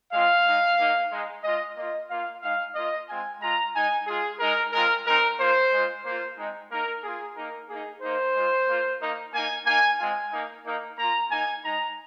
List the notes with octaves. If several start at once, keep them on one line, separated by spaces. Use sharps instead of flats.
G#3 C4 F4 F5
G#3 D#4
A#3 D#4
G#3 D#4
G#3 F4 D#5
A#3 F4 D#5
A#3 F4 F5
G#3 D#4 F5
A#3 F4 D#5
G#3 C4 F4 G#5
G#3 F4 A#5
G#3 D#4 G#5
G#3 F4 G#4
G#3 D#4 A#4
G#3 C4 F4 A#4
G#3 C4 D#4 A#4
A#3 F4 C5
G#3 F4
A#3 F4 C5
G#3 C4 D#4
A#3 D#4 A#4
A#3 F4 G#4
A#3 D#4 A#4
A#3 D#4 G#4
A#3 D#4 C5
G#3 F4
A#3 F4
A#3 D#4
A#3 D#4 G#5
A#3 D#4 G#5
G#3 C4 F4 G#5
A#3 D#4
A#3 D#4
A#3 F4 A#5
A#3 D#4 G#5
G#3 D#4 A#5